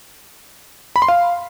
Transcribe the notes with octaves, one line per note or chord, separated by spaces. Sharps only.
B5
C6
F5